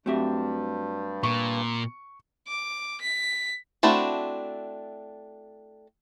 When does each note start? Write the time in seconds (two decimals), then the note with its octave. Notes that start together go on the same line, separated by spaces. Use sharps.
0.06 G2 F#3 A3 C4 G4 E5
1.23 A#2 C#6
2.48 D6
3.01 B6
3.83 A3 C4 D4 E4 F#4